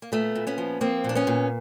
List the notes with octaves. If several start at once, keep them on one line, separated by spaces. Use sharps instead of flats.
A#3
A#2 A3 B3
A#2
B3 C#4
F3
F3 A#3 C4
A#2 D4
B3 C#4
A#2